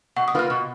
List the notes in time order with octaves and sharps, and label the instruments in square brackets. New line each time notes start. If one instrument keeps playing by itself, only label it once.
[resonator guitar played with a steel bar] B2 [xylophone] F#5
[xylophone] D#6
[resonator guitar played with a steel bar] A#3 F4 B4 [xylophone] F6
[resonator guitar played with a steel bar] B2